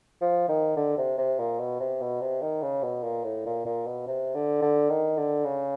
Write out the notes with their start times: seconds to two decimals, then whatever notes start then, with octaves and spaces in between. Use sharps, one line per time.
0.21 F3
0.49 D#3
0.76 D3
0.97 C3
1.18 C3
1.39 A#2
1.59 B2
1.80 C3
2.01 B2
2.21 C3
2.42 D#3
2.62 C#3
2.83 B2
3.03 A#2
3.24 A2
3.46 A#2
3.66 A#2
3.87 B2
4.07 C3
4.35 D3
4.62 D3
4.90 D#3
5.17 D3
5.45 C#3